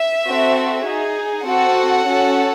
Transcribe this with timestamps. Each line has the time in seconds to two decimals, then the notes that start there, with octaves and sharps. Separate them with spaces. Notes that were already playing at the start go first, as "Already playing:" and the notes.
Already playing: E5
0.26 C4 F#4 A4
0.85 D#4 G#4
1.45 C4 F#4 A4 F#5
2.05 C#4 F#4 A4